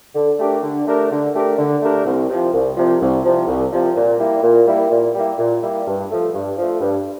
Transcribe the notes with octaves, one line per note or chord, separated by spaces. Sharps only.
D3
A3 D4 G4 A#4
D3
A3 D4 G4 A#4
D3
A3 D4 G4 A#4
D3
A3 D4 G4 A#4
C2
C3 F3
C2
C3 F3
C2
C3 F3
C2
C3 F3
A#2
G3 A#3 E4
A#2
G3 A#3 E4
A#2
G3 A#3 E4
A#2
G3 A#3 E4
G2
F3 A3
G2
F3 A3
G2